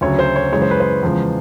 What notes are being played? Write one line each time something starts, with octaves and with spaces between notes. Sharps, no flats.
D2 C#3 F#3 C#5
C5
C#5
F#2 C#3 E3 G#3 C#5
C5
B4
C5
E2 C#3 F3 G#3